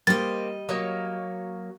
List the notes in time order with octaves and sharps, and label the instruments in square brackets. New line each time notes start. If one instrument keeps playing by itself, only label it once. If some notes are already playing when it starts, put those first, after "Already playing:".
[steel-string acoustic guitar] G3 D#5 [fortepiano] A#3 G4 [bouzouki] C4 [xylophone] A6
[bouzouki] F#3 A#3 C#5 [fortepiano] D#6